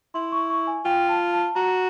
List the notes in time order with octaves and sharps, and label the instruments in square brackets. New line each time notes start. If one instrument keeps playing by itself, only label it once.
[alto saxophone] E4 [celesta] C6
[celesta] C#6
C#6
G#5
[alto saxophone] F4 [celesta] G5
[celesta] A5
A5
[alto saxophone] F#4 [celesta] A#5